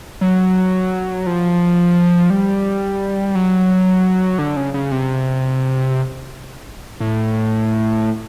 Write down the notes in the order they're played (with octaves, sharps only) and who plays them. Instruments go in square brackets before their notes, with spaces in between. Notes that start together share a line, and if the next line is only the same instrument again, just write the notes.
[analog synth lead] F#3
F3
G3
F#3
D3
C#3
C#3
C3
A2